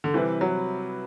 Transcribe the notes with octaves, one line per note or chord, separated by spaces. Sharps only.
D3
C3 E3 G3 C4 E4 B4
F#3